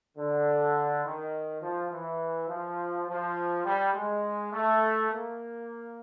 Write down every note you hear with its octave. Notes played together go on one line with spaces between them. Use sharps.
D3
D#3
F3
E3
F3
F3
G3
G#3
A3
A#3